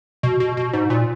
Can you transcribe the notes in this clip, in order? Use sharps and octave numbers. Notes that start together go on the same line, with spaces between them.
B2
B2
B2
G#2
A#2